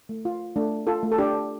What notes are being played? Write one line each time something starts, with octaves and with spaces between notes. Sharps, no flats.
A3
F4
A3 D4
F4 A4
A3
A4
D4 G4